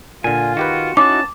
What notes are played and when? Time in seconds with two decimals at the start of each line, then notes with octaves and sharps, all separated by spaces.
0.24 A#2 D3 F4 G#5
0.57 D#3 F#4 G4 B4
0.97 C#4 D#4 E4 F#4 A5 D6